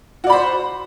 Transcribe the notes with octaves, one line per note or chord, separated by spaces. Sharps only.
F#4 C5 D5 B5